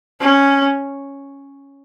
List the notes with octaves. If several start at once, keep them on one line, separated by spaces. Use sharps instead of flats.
C#4